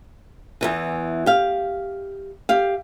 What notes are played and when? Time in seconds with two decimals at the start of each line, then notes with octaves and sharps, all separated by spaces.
0.61 E2 G2 E3
1.26 G4 F5
2.49 G4 F5